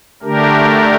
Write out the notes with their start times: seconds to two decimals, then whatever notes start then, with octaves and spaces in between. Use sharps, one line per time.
0.23 D3 A3 D4 G4 A#4